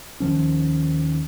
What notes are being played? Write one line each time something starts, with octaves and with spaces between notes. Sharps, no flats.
D#2 D#3 F3 C#4